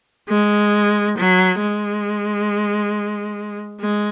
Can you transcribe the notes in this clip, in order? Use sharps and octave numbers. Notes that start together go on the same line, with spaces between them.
G#3
F#3
G#3
G#3